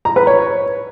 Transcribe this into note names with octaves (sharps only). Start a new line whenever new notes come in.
A#5
B4
C#5